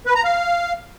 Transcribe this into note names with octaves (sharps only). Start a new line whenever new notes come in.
B4
A#5
F5